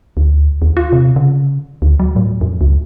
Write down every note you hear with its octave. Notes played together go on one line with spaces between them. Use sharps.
D2
D#2
F4
C3
C#3
D2
F#3
A2
F2
C#2